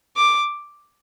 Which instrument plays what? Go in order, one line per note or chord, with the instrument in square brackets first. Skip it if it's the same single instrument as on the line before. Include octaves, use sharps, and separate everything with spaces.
[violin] D6